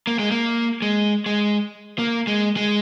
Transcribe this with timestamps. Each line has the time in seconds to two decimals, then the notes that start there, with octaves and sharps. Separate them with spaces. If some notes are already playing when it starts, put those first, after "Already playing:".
0.07 A#3
0.19 G#3
0.31 A#3
0.82 G#3
1.26 G#3
1.99 A#3
2.27 G#3
2.57 G#3